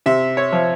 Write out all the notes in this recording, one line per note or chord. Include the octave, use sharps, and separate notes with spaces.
C3 E5
C#5
F3